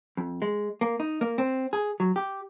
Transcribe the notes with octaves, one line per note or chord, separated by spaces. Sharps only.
F2
G#3
A#3
D#4
A#3
C4
G#4
F#3
G4